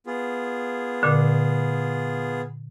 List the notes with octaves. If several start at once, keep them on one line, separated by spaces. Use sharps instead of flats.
B3 F4 G#4
A#2 D3